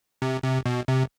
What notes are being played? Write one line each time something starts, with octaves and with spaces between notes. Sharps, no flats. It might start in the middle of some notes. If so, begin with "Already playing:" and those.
C3
C3
B2
C3